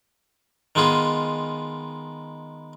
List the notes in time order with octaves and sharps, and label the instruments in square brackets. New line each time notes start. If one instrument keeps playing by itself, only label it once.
[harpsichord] D#3 G#3 B3 F4 G#4